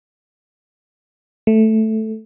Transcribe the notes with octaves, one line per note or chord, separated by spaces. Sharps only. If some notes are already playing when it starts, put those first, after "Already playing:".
A3